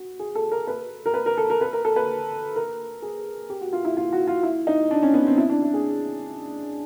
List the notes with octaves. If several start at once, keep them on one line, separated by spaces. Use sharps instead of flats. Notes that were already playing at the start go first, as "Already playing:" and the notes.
Already playing: F#4
G#4
A4
A#4
B4
A#4
B4
A#4
A4
A#4
B4
A#4
A4
B4
A#4
G#4
G4
F#4
F4
E4
F4
F#4
F4
E4
D#4
D4
C#4
B3
C4
E4
D4
E4
G#4